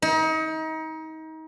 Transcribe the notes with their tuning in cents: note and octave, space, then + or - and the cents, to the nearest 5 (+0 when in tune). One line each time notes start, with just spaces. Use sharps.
D#4 +30